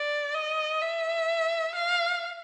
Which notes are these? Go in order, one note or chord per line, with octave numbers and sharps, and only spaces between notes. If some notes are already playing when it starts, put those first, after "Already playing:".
Already playing: D5
D#5
E5
F5